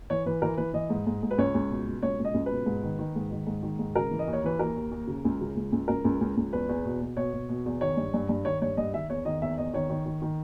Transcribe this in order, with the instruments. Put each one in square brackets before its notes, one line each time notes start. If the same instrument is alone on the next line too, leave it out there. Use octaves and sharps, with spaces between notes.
[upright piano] E3 C#5
E3 B4
E3 A#4
E3 B4
E3 D#5
G#2
G#2
G#2
B4
C#2 C#5
C#2
B2
B2
C#2 C#5
C#2
D#5
C#2
B4
B2
G#2
D#3
D#3
G#2
D#3
G#2
D#3
G#2
C#3 A#4
E3
D#5
D#2
C#5
E3 B4
D#2 A#4
D#2
D#2
C#3
C#2
C#3
C#2
C#2
C#2 A#4
C#2
C#2
C#2
E2 B4
E2
B2
B2
B2 C#5
B2
B2
E2
D#3 C#5
G2
G2
G2
D#3 C#5
G2 C#5
G2 D#5
D#3 E5
E2 C#5
D#3 D#5
E2 E5
E2 D#5
D#3 C#5
D#3
D#3
D#3